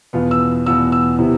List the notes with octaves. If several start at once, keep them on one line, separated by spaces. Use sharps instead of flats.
E2 B2 B3 F4
E6
E2 B2 B3 F4 E6
E6
C3 E3 B3 E4